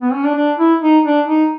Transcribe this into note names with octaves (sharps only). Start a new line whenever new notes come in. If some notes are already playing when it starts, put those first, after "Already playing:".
B3
C#4
D4
D4
E4
D#4
D4
D#4